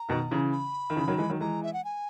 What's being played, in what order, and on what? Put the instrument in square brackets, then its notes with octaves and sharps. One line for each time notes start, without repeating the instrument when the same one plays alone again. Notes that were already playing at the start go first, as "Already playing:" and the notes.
Already playing: [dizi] A#5
[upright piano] B2 D#3
C#3 E3
[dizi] B5
[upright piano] D#3
C#3 E3
D#3 F#3
E3 G#3
D#3 F#3
[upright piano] E3 G#3 [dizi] A#5
[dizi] E5
F#5
G#5